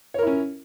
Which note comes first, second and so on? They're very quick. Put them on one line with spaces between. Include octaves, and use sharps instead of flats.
C#5 A#4 E4 C#4